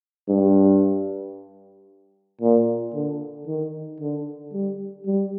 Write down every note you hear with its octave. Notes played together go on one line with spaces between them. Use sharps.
G2
A#2
D3
D#3
D3
G3
G3